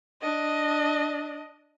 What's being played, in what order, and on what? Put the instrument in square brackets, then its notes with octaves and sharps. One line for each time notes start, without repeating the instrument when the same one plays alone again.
[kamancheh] D4 D#5